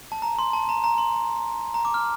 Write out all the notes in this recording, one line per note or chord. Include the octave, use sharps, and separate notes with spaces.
A5
A#5
C6
A5
A#5
A#5
C6
A#5
D6
F6